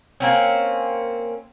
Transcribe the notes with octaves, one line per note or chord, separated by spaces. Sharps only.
A#3 C4 C#4